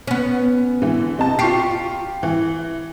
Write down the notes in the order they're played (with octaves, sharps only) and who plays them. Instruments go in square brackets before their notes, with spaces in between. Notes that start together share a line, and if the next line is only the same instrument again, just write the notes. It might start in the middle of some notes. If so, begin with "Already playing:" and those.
[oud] B3 C#4
[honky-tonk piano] D3 E3
C3 D#5 A5
[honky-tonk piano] F4 C#6 C7 [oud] G4
[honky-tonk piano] E3